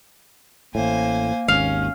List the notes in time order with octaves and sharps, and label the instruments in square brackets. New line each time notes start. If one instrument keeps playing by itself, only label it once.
[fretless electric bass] A1 A2 [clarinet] A#3 [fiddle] C5 G#5
[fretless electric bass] G#1 D#2 [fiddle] C#4 [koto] F5